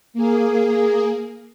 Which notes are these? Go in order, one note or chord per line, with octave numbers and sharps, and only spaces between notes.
A#3 G#4